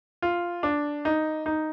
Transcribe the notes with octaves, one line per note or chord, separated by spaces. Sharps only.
F4
D4
D#4
D#4